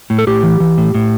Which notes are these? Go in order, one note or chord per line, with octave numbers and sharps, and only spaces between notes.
A2
A4
A2 G4
E3
E3
A2
A2